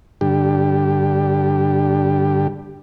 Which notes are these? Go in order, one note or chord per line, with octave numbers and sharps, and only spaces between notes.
G2 D3 G4